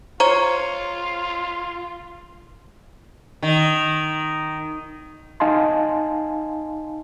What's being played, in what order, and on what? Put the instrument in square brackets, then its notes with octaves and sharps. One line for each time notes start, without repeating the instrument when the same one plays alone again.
[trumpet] F4 [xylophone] C5 A#5 [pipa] C#5
[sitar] D#3
[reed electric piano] D#4 D#5 F5 G#5 A5 C6